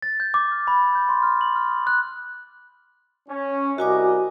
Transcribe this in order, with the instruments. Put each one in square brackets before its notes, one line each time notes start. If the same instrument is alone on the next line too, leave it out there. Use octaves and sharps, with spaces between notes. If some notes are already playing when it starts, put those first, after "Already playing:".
[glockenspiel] A6
G6
D6
F6
B5
G6
C6
F6
F#7
F6
D#6
F#6
[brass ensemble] C#4
[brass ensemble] C2 A#4 D#5 [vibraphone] F#4 G#5 D6